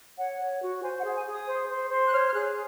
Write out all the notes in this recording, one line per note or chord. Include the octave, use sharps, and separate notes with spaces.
C#5 F#5
C#5
F#4
C5 G#5
F#5
G#4
G#5
G#4
D#6
C5
C5
C5
F#6
C#5 F6
F6
G#4 F#6